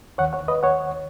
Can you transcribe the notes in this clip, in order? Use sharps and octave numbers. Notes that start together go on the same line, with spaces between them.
D#2 D#3 C#5 F#5
C#5 F#5
B4 D#5
C#5 F#5